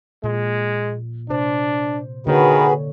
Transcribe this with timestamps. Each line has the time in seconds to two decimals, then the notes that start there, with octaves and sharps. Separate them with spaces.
0.24 A#2 G#3
1.29 C3 D4 C5
2.27 D3 D#3 A#3 F#4 G#4 B4 C#5